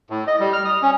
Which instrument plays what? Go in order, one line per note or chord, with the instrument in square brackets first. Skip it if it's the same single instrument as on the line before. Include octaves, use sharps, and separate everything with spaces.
[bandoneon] A2
D#5
G3
F6
D#6
C#4